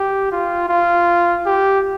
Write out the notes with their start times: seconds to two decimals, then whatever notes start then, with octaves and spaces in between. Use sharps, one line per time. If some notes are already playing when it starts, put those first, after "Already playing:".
Already playing: G4
0.32 F4
0.69 F4
1.45 G4